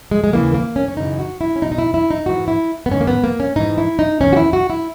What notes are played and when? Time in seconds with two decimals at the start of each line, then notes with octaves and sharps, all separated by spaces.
0.11 G#3
0.24 G#3
0.32 D#2 C#3 E3 A#3
0.54 A#3
0.76 C#4
0.88 C#4
0.97 F#2 C#3 E3 D#4
1.19 F#4
1.41 E4
1.56 C#4
1.62 B2 D#4
1.67 E2
1.72 D#4
1.78 E4
1.94 E4
2.11 D#4
2.26 G#2 E3 F#4
2.48 E4
2.86 B3
2.91 G#2 D#3 C#4
3.01 A#3
3.07 B3
3.24 A#3
3.40 C#4
3.56 G#2 E3 D#4
3.78 E4
3.99 D#4
4.21 E2 D#3 C#4
4.33 F#4
4.37 E4
4.53 F#4
4.70 E4